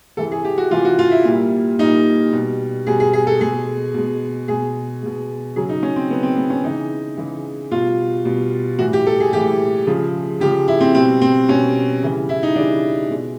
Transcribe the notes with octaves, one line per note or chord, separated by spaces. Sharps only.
C3 E3 G#3 A4
G#4
G4
F#4
C3 E3 G#3 F4
F#4
F4
E4
A#2 G3
A#2 G3 D#4
B2 G3
B2 G3 G#4
G#4
G#4
A4
B2 G#3 G#4
B2 G#3
B2 G#3 G#4
B2 G#3
C#3 F#3 G#4
D#4
C#4
C4
C#3 F#3 B3
C4
B3
C#4
C#3 E3 G#3 D#4
C#3 E3 G#3
B2 G3 F4
B2 G3
A2 E3 G3 F#4
G4
A4
G#4
A2 E3 G3 G4
C#3 F3 G#3
C#3 F3 G#3 G4
E4
C4
B2 G3 C4
C4
B2 G3 C#4
C#3 E3 G3
E4
D#4
C#3 E3 G3 D4
B2 G#3